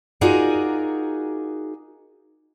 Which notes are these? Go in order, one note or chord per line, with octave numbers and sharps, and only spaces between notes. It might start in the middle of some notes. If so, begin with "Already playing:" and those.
D#4 F4 F#4 G#4 A#4 D5